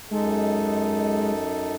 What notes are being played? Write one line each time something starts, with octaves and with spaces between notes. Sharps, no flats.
F#2 G#3 D#4 A4